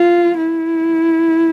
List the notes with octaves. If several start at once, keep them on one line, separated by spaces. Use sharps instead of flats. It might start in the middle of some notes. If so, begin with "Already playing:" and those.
Already playing: F4
E4